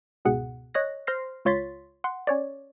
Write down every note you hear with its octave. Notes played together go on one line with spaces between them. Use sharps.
C#2 G#2 B2 G#4 F#5
C#5 D#5 F#6 A#6
C5 C6 F6 A#6 C7
C#2 F4 C#5 C6 A6 B6
F#5 C6
C#4 C#5 D5